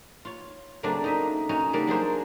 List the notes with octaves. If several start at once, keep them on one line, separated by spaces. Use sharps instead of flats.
F4 C#5
C#3 F#3 A3 A#3 C4 D4
D#4 D#5 E5
C#4 D#4 F#4 C#5
C#3 G3 A#3 D4 A#4
F#3 D4 G#4 C5